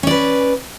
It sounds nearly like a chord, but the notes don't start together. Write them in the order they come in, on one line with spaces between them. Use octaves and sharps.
C#4 D5 B4